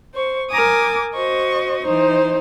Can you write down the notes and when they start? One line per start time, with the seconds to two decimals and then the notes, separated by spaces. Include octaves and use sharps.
0.14 C5 C#6
0.50 A#4 G#5 D6 D#6
1.14 F#4 C5 D#5 C#6
1.84 E3 D#4 C5